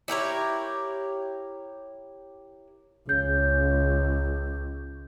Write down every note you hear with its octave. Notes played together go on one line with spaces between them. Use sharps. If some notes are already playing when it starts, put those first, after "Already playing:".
E4 G4 A#4 C#5
C#2 C#3 G6